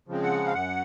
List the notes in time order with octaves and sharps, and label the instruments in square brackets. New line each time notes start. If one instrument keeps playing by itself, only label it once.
[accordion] C#3 F3 G#3 C4
F#5
F5
F#2 F#5